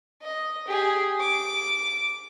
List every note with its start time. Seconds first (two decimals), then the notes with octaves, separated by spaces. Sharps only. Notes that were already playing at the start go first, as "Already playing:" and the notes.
0.22 D#5
0.67 G4 G#4
1.20 D6